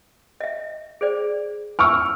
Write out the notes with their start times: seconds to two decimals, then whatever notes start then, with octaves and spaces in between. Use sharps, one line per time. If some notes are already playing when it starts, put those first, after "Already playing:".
0.40 D#5 E5
1.01 G#4 C5 D5
1.79 G#5 C#6 E6 F6